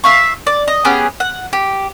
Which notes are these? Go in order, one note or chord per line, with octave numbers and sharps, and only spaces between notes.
E5 F5 C#6
D5
D#5
B3 C#4 G4 G#4
F#5
G4